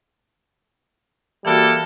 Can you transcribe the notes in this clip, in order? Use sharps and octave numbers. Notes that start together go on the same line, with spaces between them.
E3 G3 A#3 F#4 A4